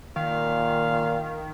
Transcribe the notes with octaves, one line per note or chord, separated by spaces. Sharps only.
A#2 D#3 F5